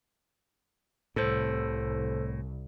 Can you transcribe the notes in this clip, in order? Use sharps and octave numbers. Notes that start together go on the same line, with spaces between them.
C2 A2 A4 C5